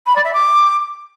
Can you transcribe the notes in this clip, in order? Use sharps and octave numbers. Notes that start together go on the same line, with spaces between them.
B5
D5
E5
D6